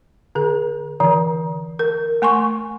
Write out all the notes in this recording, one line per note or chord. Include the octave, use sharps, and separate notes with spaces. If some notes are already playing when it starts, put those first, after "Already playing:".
D3 G#4
D3 E3
A#4
A3 G#5 C6 C#6